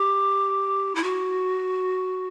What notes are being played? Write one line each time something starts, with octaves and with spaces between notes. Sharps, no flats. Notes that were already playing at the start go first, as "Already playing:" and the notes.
Already playing: G4
E4
F#4